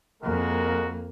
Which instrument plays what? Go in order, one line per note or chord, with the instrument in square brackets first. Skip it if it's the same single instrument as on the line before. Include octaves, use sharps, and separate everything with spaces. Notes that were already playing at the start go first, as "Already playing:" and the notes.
[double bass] F2 A#3 [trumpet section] G#3 F#4 A#4